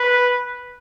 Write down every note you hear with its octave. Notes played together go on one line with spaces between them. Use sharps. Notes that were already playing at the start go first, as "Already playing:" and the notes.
Already playing: B4